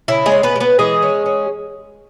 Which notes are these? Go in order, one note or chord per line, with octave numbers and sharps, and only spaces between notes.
C#3 E4
G#3 G#4
C#4
B3 B4
G#3
B3 B4
E3 G#3 G#4
C#4
C#4